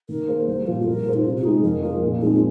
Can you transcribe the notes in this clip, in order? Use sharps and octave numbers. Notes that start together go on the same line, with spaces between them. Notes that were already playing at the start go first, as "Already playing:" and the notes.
D#3 A#4
A#3 G#4 C5
C2 C5
A#2 F3 F4
C2 A#4
A#2 A#3 G#4 C5
D#4
C3 F4
F4
G#3 D#4 G#4
F2 A#4
F3 G#3 F4 G#4 A#4
A#2
F3 G#3 C4 D#4